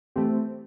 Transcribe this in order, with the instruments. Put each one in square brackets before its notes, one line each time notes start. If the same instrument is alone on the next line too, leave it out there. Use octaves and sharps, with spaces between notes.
[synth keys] E3 A3 C4 G4